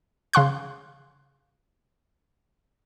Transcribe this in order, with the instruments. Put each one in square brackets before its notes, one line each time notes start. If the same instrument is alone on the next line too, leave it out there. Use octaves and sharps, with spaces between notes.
[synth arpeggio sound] C#3 F5 C6 F#6